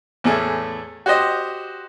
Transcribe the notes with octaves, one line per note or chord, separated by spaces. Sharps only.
E2 A2 A3 G#4
F#4 G4 C5 D#5